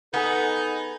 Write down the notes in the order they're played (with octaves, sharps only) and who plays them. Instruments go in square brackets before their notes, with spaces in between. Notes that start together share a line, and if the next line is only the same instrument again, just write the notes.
[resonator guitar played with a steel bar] B3 [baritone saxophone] D#4 [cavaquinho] G#4 D#5 [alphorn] A4